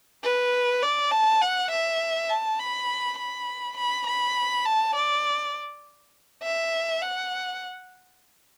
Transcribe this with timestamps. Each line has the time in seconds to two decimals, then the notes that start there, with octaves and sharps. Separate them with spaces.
0.23 B4
0.82 D5
1.11 A5
1.41 F#5
1.71 E5
2.29 A5
2.59 B5
3.18 B5
3.77 B5
4.06 B5
4.65 A5
4.95 D5
6.43 E5
7.01 F#5